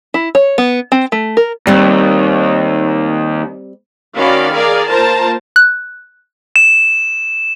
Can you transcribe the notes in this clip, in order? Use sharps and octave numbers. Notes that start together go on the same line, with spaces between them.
E4
C#5
B3
C4
A3
A#4
D#2 G3 C4
D#3 C#4 F#4 D5 F5 B5
G#4 A#4 D5 F5
A#3 F4 A#4 C5 A5 A#5
F#6
E7